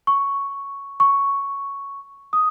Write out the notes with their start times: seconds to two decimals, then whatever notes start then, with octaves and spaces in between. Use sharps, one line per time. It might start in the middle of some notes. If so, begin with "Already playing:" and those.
0.07 C#6
1.00 C#6
2.33 D#6